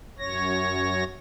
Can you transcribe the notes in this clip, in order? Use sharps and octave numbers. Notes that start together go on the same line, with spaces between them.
F#2 C#5 A#6